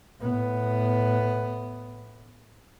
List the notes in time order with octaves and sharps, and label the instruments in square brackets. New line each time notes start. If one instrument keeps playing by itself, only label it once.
[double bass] A2 B3